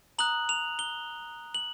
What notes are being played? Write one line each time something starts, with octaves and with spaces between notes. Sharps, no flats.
A#5 D#6 F#6 F#7
F7
G7
F#7